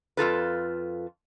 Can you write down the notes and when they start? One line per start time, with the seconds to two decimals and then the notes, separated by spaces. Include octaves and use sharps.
0.17 F2 F4 A4 B4